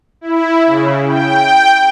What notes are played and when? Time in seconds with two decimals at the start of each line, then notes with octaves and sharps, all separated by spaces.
0.21 E4
0.66 C#3
1.06 G5